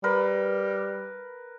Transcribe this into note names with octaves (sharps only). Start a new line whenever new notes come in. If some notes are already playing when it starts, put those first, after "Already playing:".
G3 A#4 B4